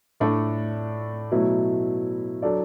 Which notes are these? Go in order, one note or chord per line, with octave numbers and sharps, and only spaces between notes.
A2 A3 D4 A4 D5
B2 F#3 A3 E4
F#3 D4 A4 D5